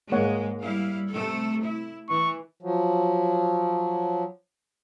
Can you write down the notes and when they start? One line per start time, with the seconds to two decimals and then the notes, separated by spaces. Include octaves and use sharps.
0.12 G#2 G#3 A#3 C#5 F#5
0.61 G3 E4 F5
1.12 C3 A3 A4
1.62 E4
2.09 E3 C#6
2.62 F3 F#3